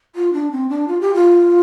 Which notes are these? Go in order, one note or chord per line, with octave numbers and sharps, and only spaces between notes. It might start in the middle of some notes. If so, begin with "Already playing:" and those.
F4
D4
C4
D4
F4
G4
F4